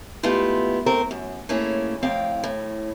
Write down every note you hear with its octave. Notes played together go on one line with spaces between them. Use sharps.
G#3 A3 B3 E4 F4 G4
A3 C4 A#4
F#2
A3 A#3 C#4 E4 G#4
F2 A2 C4 F5 G5
A2